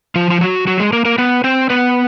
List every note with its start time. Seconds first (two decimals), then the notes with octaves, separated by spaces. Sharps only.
0.15 F3 F4
0.30 F4
0.41 F#3 F#4
0.67 F#3 F#4
0.80 G#3 G#4
0.93 A#3 A#4
1.05 A#3 A#4
1.18 B3 B4
1.44 C4 C5
1.70 B3 B4